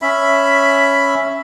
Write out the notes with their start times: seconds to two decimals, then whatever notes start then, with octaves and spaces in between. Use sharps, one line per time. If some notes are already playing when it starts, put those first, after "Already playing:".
0.02 C#4 E5 B5